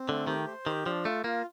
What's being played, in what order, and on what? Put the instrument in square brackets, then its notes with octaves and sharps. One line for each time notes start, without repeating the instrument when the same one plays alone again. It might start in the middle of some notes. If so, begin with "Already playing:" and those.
Already playing: [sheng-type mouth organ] C4
[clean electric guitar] D3 [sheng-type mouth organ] A3
[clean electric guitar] D#3 [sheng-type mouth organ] G4
[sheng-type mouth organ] C5
[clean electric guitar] D#3 [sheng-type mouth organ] G4
[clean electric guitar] F3 [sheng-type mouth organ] D4
[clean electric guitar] A3 [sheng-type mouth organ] F4
[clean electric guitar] A#3 [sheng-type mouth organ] F4